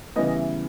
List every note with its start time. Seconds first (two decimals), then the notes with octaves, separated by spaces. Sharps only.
0.16 C#3 E3 G3 B3 D#5
0.37 E5